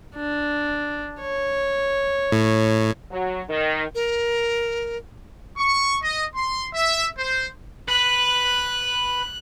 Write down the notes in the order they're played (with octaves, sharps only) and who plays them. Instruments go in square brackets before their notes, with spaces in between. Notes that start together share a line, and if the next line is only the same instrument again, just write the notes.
[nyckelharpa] D4
C#5
[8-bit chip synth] A2
[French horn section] F#3
D#3
[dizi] A#4
[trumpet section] C#6
D#5
C6
E5
C5
[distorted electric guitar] B4 [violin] F#6